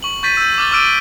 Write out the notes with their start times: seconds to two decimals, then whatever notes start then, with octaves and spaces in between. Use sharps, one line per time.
0.03 C#6 F#7
0.23 C#6 G6 A6 B6 D#7
0.37 E6 G6
0.58 D6 F6 A6
0.71 C#6 D6 E6 F6 D7 D#7